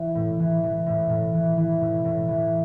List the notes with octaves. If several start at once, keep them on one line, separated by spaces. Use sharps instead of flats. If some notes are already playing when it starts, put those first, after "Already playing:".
Already playing: E3
A2
E3
E3
A2
A2
E3
E3
A2
A2
E3